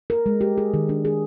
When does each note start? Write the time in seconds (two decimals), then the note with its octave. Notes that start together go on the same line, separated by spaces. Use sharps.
0.10 A#4
0.26 G#3
0.41 G4
0.58 G#4
0.74 D#3
0.89 D4
1.05 G#4